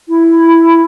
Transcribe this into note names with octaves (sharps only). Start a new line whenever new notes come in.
E4